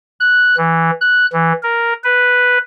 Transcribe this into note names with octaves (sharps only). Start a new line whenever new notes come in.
F#6
E3
F#6
E3
A#4
B4